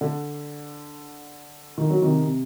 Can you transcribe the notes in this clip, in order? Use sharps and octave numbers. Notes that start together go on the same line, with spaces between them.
D3
D#3
F#3
C3 D#3
C3